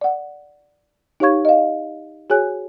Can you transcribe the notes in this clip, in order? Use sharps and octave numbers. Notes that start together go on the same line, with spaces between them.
D5 F#5
D#4 G4 C#5 F5 C#6 G#6
D#5 F5
F#4 G#4 C#5 G#5 F#6